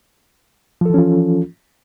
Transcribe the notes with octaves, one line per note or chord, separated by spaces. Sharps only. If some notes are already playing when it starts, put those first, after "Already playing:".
E3 F3 C#4 F4 A4